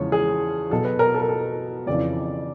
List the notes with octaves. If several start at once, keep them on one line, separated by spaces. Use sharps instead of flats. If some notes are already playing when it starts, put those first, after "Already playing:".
Already playing: E2 C#3 F3 G#3 C#5
G#4
B2 F#3 A4
B4
A#4
A4
A#4
A4
F2 C#3 E3 D5